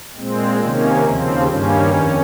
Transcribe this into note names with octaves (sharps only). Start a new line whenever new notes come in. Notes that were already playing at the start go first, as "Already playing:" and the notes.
A#2 G#3 C4
C3 D#3 A#3 C#4
D#2 C#3 F3 C4
G2 D#3 G3 A#3 C#4
F2 D#3